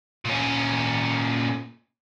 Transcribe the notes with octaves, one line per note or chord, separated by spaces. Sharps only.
A#2 C#4